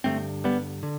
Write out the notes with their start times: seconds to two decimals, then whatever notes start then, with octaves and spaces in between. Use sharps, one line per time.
0.04 G2 D3 A3 C4
0.44 G3 B3
0.83 D3